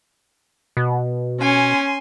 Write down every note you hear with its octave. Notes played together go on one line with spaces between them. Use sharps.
B2
C#4 G#5 C6